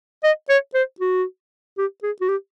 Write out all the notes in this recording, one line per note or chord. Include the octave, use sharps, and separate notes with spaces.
D#5
C#5
C5
F#4
G4
G#4
F#4
G4